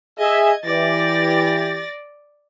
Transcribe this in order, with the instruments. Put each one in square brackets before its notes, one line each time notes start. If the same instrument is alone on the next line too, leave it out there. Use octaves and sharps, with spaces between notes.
[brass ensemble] G#4 E5 [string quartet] D#5 G#6
[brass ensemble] E3 G4 [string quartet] D5 A6 A#6